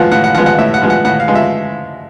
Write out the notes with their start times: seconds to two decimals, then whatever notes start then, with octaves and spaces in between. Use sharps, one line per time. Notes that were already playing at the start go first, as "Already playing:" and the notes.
Already playing: A2 F3 G#3 B3 F5 F#5
0.12 A2 F#5
0.24 F#5
0.35 F3 G#3 B3 F#5
0.46 F#5
0.58 A2 E5
0.74 F#5
0.82 F3 G#3 B3
0.90 F#5
1.05 A2 F#5
1.20 F5
1.28 F3 G#3 B3
1.35 E5